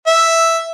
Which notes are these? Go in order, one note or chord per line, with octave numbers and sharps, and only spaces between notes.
E5